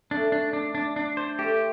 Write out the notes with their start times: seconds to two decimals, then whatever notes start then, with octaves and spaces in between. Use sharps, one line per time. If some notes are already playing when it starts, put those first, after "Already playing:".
0.11 A3 D4
0.32 D4
0.53 D4
0.75 D4
0.96 D4
1.17 C5
1.39 A3 G4